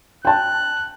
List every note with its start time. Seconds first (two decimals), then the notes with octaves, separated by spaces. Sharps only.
0.25 G5 A5 F#6